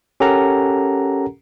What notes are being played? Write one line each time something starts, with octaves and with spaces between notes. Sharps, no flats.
C#4 G4 A4 A#4 F#5 A#5